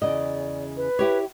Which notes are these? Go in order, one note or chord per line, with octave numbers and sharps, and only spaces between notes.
E2 C#3 D5 D#5
B4
E4 G4 C#5